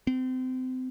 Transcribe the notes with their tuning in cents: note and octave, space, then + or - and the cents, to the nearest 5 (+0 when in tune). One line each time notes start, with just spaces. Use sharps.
C4 -30